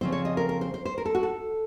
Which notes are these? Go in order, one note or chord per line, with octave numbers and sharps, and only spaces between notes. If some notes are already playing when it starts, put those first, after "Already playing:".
C#3 F3 C4 C5
C#5
D#5
A#4
A#4
C5
C5
C5
A#4
A4
F#4
A4